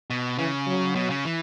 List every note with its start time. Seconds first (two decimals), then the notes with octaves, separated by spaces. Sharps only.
0.10 B2
0.38 C#3 E3
0.67 F#3
0.95 B2
1.10 C#3
1.25 E3